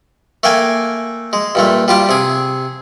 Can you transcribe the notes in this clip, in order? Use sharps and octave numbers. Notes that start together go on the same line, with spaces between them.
A3 A#3 G5 G#5
G#3
G2 A#2 A3
G3 F4 G4
C3 G#4